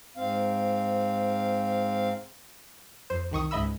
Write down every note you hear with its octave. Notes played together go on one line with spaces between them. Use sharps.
G#2 C4 F5
F2 C5
C2 D#3 C#6 D#6
C#2 G#2 D#5 E5 B5 E6